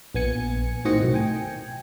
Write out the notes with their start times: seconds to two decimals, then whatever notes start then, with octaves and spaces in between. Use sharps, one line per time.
0.14 A#1 B3 G#5 C#7
0.85 A2 D#3 C4 F#4 D#5 C#7
1.02 B1 A2
1.14 G5 G#5